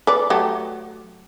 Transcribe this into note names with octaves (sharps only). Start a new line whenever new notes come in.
B4 D5
F#3 A3 G4